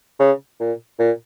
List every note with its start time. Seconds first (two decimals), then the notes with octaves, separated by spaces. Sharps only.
0.20 C#3
0.60 A#2
0.99 A#2